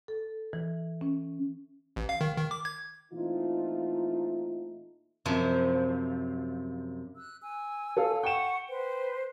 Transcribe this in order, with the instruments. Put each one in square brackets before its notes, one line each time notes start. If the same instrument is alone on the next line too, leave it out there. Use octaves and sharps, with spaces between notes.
[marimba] A4
E3
C#4
[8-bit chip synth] A1
F5
D#3
D#3
D6
G#6
[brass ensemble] A#2 E3 A3 C4 D#4 F4
[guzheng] F#2 C3 F3
[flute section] E6 F#6
G#5 E6
[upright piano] A4 C#5 F5
[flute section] F#5 C#6 [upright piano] G5 E7
[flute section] B4 C5